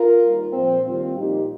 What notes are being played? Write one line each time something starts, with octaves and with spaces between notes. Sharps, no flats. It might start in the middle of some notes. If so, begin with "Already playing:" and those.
Already playing: F4 A#4
D#2 D#3 G3
A#2 F3 C4
D#2 D#3 G3 C4 F4
A#2 F3 D#4 G4